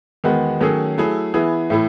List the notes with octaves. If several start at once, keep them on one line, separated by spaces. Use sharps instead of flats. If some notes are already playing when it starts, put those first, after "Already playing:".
E2 D#3 G#3 B3 F#4
D#3 F#3 A3 C#4 G#4
F#3 A3 E4 G#4
E3 B3 E4 G#4
A2 E3 A3 E4